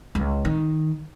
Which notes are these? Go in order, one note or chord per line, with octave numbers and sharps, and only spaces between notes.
C#2
D#3